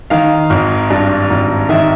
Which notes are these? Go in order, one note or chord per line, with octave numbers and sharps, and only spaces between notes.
D#3 F5
G#1
G2
G#1
D#3 E5